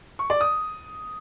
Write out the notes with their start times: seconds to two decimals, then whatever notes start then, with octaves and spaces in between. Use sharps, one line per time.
0.19 C#6
0.30 D5
0.41 D#6